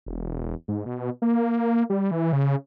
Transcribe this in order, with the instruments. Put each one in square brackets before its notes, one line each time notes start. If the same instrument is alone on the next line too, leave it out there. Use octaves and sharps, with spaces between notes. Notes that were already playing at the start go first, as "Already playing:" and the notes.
[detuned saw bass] E1
G#2
B2
A#3
G3
E3
C#3